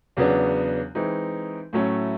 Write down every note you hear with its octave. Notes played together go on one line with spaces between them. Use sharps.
E2 C#3 F#3 B3 D4
E3 G#3 C4 D#4
A2 F#3 A3 C#4 E4